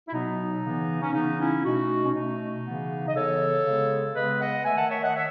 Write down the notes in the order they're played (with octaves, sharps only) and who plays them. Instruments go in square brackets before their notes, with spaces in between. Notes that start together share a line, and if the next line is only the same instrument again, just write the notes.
[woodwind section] E4
B2 F#3 B3 D#4
C#3 E3 B3
C#4
C#3 E3 B3 D#4
C#4 E4
B2 A3 D#4 F#4
C#4
B2 A3 D#4
C#3 E3 B3
D#5
C#3 E3 B3 A4 C#5
C#3 G#3 B3
C#3 G#3 B3 B4 D#5
D#5 F#5
D#3 A3 E5 G#5
F#5 A5
C#5 E5
D#5 F#5
C#5 E5